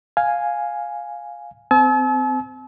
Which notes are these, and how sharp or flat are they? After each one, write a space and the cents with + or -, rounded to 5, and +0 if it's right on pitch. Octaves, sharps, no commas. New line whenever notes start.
F5 +5 G#5 +0
C4 -25 A5 -45 E6 -35